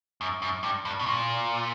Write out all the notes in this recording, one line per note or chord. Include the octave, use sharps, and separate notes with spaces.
F#2
F#2
G2
G2
B2
A#2